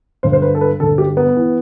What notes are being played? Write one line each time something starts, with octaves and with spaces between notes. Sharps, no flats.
G2 D3 C5
C5
B4
A4
B4
G2 D3 A4
G4
B3
E3